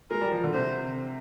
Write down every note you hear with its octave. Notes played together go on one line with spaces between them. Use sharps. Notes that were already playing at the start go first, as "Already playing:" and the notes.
G#3 A#4
G3
F3
D3
C3 C5